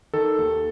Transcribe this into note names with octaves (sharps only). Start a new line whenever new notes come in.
D#3 A4
D#2